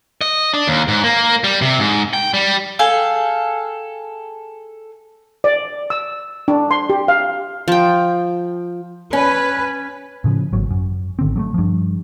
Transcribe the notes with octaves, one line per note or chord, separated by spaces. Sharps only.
D#5
D4
D#2
G#2
A#3
G3
C3
G#2
G5
G3
G#4 A4 F5 G5
D5
E6
D4
C6
G4
F5
F3 G5
C#4 B4
A2 C#3 F3
G#1 F#3
F#2
G#1 D3 C4
F#3 G3 A3
G2 F3